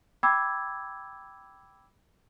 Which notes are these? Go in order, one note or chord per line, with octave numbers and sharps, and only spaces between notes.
G5 B5 D6 E6 G#6